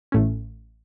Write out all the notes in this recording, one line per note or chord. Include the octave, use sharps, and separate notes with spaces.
A1 A2 A3 C#4